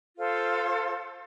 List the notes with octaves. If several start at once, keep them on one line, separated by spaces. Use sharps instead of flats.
F4 A4 C5